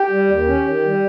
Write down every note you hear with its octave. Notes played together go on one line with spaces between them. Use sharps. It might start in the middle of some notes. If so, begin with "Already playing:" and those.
Already playing: G4
G3
D#2
C#4
D#3
G3